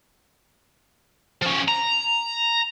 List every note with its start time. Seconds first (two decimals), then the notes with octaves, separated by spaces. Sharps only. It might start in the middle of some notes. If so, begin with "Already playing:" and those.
1.42 F3 C#4
1.68 A#5